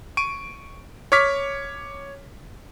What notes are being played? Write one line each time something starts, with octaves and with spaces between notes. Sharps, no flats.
C#6 D7 D#7
C#5 C#6 D6 F6 B6